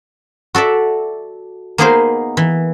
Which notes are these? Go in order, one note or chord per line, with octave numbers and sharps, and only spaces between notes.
F#4 A4 D5 E5
A#3 B3 D#4 G#4 A#4 C5
E3